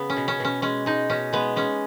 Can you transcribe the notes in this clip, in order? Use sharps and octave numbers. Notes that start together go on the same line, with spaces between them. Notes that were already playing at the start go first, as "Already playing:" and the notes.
Already playing: C#3 B3
C#4
B2
C#4
B2 C#4
G#3 C#4
G#3 D#4
B2 C#4
G#3 B3
G#3 C#4